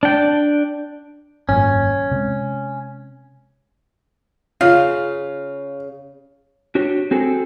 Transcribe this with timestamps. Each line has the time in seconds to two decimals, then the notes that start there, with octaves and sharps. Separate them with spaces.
0.03 D4 G5
1.49 G#1 F#2 A#2 C#4
2.11 C3 G#3
4.61 C#3 F4
6.75 D4 F#4 G4 C#5
7.11 C4 F#4 G#4 A4